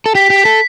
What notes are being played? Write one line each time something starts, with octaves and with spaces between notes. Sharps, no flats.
A4
G4 B6
G4
B6
A4